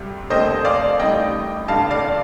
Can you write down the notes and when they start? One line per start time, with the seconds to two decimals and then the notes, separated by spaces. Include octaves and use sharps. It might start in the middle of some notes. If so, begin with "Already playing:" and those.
Already playing: D2 C3 G3
0.30 F1 D#2 D3 A3 C4 C5 D#5
0.65 D5 F5
1.00 A1 A2 G3 C4 D#4 D#5 G5
1.68 A1 G2 D3 F5 A5
1.90 D5 F5